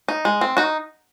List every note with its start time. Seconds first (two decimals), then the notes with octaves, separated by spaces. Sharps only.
0.08 D#4
0.25 G#3
0.41 C4
0.57 D#4 F#4